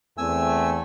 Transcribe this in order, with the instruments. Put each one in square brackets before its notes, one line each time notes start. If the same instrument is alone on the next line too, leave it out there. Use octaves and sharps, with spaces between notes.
[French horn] E2 [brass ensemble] A3 C4 [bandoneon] G#5 E6